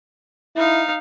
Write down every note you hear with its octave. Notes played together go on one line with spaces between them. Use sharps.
D#4 E4 F5